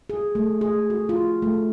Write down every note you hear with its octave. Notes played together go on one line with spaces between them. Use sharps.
G#4
A3
G#4
F#4
F4
A3